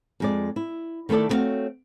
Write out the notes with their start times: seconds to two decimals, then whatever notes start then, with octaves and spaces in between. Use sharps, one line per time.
0.20 F2 G#3 D5
0.56 E4
1.09 D#3 A3 E4 A4 D5
1.29 A3 B3 C4 F#4 C#5 F5